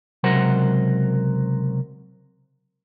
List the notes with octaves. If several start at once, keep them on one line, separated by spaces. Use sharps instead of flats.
C#2 C3 F#3 A#4 C5 F#5